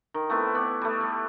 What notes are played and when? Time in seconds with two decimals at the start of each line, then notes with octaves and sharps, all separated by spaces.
0.14 D#3
0.30 A3 B3 C4 E4
0.55 B3 D5
0.81 G3 A3
1.01 G3